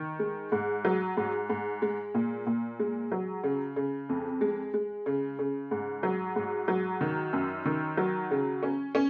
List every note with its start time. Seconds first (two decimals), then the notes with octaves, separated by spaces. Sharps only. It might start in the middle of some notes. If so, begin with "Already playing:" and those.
Already playing: D#3
0.19 G#3
0.52 G#2
0.85 F#3
1.17 G#2
1.50 G#2
1.82 G#3
2.14 A#2
2.46 A#2
2.79 G#3
3.12 F#3
3.44 C#3
3.76 C#3
4.09 F2
4.41 G#3
4.74 G#3
5.06 C#3
5.39 C#3
5.71 G#2
6.03 F#3
6.36 G#2
6.68 F#3
7.01 D#3
7.33 F#2
7.65 D#3
7.97 F#3
8.31 C#3
8.63 C#4
8.95 C#4